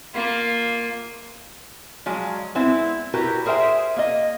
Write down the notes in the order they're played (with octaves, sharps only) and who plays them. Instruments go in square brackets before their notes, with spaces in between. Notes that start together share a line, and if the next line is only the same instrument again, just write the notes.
[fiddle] A#3 F4
[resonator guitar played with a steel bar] F3 F#3 G#3
G#3 B3 C4 E4
E4 F#4 G4 A#4 B4
G#4 A#4 C5 E5 G5
A#3 D#5